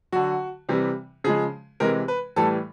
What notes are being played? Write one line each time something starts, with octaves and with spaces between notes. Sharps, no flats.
D3 F#3 F#4
C3 E3 G3
C#3 F3 G#3 G#4
C3 E3 G#3 A#4
B4
A2 E3 G3 A4